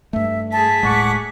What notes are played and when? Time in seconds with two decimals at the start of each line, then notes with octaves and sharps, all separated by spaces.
0.13 G2 A3 E5
0.52 G#4 A5 B6
0.83 D1 A2 G#3 F#5 C#6 D6